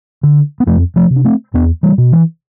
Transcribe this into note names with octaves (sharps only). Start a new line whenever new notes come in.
D3
B3
F2 F3 A3
F3 A3
C3
D4
A3 C4
E2 B3 D4
E3 G3
B2
E3